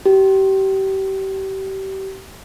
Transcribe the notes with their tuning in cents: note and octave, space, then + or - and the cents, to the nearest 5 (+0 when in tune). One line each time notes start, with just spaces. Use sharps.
G4 -30